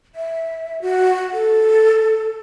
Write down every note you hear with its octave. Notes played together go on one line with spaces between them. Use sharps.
E5
F#4
A4